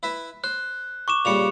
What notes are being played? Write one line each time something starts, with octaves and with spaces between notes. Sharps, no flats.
E4 B4 E5
C5 F#6
C#6 D6 E7
A#2 C#3 G3 C#7 F7